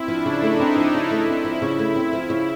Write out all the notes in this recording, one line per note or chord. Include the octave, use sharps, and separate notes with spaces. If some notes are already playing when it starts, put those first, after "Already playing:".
Already playing: C4 E4
F3 D4
C#3
A3 D#4
C4
F3
C#3
A3 E4
C4
F3
C#3
A3
C4
F3
C#3